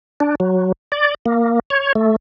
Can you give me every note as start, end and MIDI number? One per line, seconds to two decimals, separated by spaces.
0.20 0.35 62
0.40 0.72 54
0.92 1.14 74
1.26 1.59 58
1.70 1.93 73
1.95 2.16 57